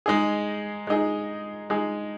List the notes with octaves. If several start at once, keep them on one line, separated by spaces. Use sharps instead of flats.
G#3 D#4 G#4
G#3 D#4 G#4
G#3 D#4 G#4